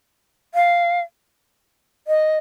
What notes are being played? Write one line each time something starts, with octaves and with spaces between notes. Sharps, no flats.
F5
D#5